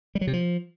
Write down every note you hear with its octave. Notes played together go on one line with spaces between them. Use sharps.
G3
F#3
C3
F3